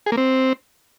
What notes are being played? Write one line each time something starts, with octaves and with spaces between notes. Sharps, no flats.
G#4
A#3
C4